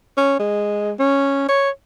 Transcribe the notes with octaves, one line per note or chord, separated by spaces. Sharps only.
C#4
G#3
C#4
C#5